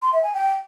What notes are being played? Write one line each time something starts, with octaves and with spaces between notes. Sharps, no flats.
C6
E5
G#5
G5